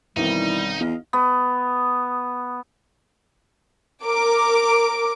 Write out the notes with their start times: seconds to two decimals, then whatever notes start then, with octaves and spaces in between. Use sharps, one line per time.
0.16 B1 D#3 E3 G3 C4 D#4
0.80 E2 D#5 F5
1.13 B3
4.04 A#4 D6